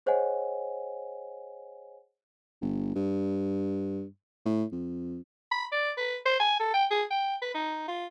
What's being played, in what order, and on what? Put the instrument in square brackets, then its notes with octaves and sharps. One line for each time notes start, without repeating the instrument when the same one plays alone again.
[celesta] G#4 C5 C#5 D#5 F#5 G#5
[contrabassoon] G1
G2
A2
F2
[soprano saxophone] B5
D5
B4
C5
G#5
A4
G5
G#4
G5
B4
D#4
F4